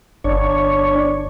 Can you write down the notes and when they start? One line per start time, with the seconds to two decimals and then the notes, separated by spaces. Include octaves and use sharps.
0.24 G1 D4 C#5